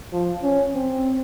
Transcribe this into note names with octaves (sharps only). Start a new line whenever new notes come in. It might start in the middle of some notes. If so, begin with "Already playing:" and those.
F3
C#4
C4